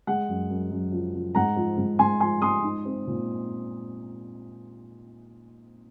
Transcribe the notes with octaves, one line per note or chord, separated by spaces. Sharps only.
G#3 F#5
F#2
F#2
F#2
F3
F3
G#2 F#5 A#5
F3
G#2
G#2 G#5 C6
F3 G#5 C6
G#2 C6 D#6
D#4
C4
A#2